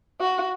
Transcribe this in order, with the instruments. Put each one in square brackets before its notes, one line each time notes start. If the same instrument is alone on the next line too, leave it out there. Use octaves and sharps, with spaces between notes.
[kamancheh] F#4